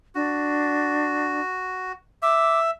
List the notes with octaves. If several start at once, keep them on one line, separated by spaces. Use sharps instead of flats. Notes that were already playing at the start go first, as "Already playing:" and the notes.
D4 F#4
E5 D6